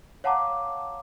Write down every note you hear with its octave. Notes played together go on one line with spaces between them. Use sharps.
C#5 F5 F#5 A5 A#5 D6